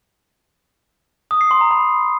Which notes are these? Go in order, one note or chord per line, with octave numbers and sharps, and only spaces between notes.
D#6
C7
C6
A#5
B5